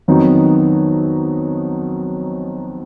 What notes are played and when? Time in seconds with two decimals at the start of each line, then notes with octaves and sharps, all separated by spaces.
0.08 F2 D#3 F#3 B3 D#4